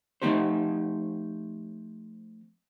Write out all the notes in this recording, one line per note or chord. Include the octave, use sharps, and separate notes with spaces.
F3 A3 C4 D#4 G4 C5